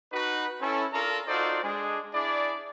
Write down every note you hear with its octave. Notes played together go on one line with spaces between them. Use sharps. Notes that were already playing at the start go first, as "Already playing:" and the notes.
D#4 F#4 B4
C#4 E4 A4
D4 F4 A4 A#4 A#5
D#4 F4 F#4 A4 C5 D5
G#3 D4 G#4
D4 E4 G#4 D5